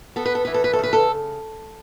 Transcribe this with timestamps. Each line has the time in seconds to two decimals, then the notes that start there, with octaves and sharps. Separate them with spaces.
0.16 B3 A4
0.26 B4
0.35 A4
0.45 E3 B4
0.54 A4
0.64 B4
0.73 A4
0.79 C#3 B4
0.93 A4